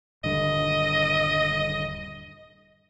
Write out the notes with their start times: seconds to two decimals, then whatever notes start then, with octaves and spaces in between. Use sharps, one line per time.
0.24 D#1 G2 D3 D#5